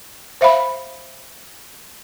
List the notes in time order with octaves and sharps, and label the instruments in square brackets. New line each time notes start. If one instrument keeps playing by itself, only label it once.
[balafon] C5 E5 F5 B5